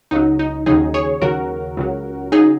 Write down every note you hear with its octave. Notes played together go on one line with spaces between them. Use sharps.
C#2 C#3 F#3 D#4
D#4
D#2 C#3 F#3 D#4 G#4
G#4 C#5
D#2 C#3 F#3 F#4 A#4
C#2 C#3 F#3
C#3 F#3 D#4 G#4